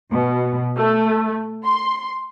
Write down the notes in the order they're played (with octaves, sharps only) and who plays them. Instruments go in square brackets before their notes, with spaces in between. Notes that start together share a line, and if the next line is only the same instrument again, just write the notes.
[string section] B2
A3
C6